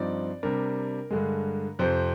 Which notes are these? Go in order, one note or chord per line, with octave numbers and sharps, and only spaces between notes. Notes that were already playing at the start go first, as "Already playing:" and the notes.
Already playing: G2 F3 C4 D#4 D5
C3 G3 D4 A#4
G2 D3 G#3
F2 C3 F3 C5